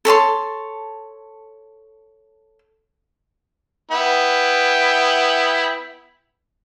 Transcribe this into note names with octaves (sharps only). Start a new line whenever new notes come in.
A4 C#5 A5 C6
B3 E4 G5